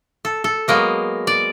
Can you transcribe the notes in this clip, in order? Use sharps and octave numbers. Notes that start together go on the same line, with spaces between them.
A4
A4
F#3 G#3 A#3 B3
D5